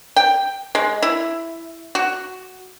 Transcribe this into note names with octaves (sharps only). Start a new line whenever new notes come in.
G5
G#3
E4
F#4